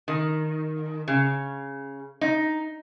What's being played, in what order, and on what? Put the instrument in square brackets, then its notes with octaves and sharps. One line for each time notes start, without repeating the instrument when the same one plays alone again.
[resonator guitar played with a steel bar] D#3
C#3
D#4